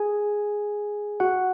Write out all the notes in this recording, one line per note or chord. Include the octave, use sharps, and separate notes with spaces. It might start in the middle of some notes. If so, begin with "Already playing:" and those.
Already playing: G#4 G#5
F#4 F#5